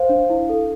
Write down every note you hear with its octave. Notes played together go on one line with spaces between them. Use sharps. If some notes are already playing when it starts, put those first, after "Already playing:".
Already playing: C5 F5
D4
E4
A4